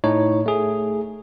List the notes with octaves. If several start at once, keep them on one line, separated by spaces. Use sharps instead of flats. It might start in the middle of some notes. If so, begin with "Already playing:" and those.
A2 D#4 C#5
A3 G#4